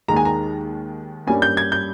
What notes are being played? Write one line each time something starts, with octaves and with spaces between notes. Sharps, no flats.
D#2 D#3 G#3 A#5
G#5
A#5
G2 G3 A#3 C#4 G#5
G6
G#6
G6